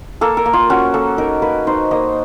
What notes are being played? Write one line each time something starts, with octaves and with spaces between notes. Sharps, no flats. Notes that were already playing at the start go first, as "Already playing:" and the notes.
A#3 A4
A#4
A#3
F4
C#4 F#4
A#3 A4
D#4 A#4
A#3 B4
D#4 C5
A#3 D#5